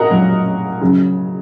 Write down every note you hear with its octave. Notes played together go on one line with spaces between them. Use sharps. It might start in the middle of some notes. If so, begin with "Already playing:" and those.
Already playing: A#2 F#4 A#4 D#5 F#5
A#2 F#3
C#3 F#3